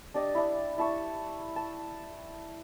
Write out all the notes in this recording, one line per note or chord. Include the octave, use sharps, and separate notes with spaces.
D4 G4 D5 D#5
D4 E4
E4 A5 C#6
A5